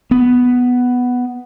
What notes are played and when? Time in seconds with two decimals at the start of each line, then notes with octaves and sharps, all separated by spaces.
0.11 B3